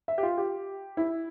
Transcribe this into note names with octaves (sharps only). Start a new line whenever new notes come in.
E5
G4
F4
G4
E4